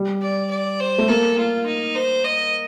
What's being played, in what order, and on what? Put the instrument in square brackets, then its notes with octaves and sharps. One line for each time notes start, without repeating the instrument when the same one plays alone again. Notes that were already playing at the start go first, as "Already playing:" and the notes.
Already playing: [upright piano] G3
[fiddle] D5
D5
C5
[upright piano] A3
[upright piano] A#3 [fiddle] A4
[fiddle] F4
D#4
C5
D#5